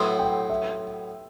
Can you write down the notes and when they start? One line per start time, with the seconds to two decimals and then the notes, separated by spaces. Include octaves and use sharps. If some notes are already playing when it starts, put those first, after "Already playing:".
Already playing: A2 F#3 B3 E4 C6
0.19 G5
0.50 E5